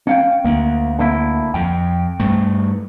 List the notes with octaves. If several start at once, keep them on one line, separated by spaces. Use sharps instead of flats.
C#4 F5 G5
D2 A#3
D3 A#3 E4
F2 G5
G2 A3